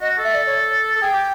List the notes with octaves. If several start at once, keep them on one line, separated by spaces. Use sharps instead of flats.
F#4 D#5
A4
E5
D5
C#5
A4
G#4 G5
G4